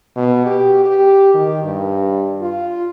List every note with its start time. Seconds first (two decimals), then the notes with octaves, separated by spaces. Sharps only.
0.17 B2
0.46 G4
0.86 G4
1.35 D#3
1.64 G2
2.41 F4